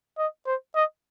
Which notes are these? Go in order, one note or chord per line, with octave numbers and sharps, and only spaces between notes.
D#5
C5
D#5